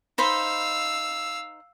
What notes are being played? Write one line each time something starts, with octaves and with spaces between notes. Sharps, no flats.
D#4 C5 F5 B5 E6